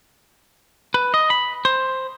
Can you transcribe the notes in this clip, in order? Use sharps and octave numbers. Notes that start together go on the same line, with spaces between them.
B4
D#5
B5
C5